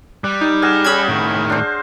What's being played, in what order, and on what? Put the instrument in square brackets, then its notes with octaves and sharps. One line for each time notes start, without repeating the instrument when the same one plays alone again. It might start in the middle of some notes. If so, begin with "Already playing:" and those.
[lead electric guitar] G3 [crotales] F#6
[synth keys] D#4 [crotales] G6
[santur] G#4 F#5 G#5 [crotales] F6 A#6 E7
[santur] C#4 G#4 [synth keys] B5 G#6
[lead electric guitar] A2 D#3
[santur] D4 C5